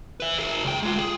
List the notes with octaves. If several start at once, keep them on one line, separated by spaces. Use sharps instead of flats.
B4 E5
G#4 A#4
C#2 G5
G#3 F4
G#4